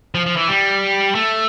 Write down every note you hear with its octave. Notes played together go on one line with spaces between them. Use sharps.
F3
F3
E3
G3
A3